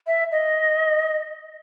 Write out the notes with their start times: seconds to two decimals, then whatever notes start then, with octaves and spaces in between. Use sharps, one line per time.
0.07 E5
0.31 D#5